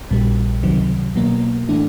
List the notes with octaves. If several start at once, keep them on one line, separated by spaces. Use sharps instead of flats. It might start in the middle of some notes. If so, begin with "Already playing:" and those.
A#1 A#2 G3
C#2 C3 D#3 F#3
B2 F#3 A#3
A2 E3 A3 D4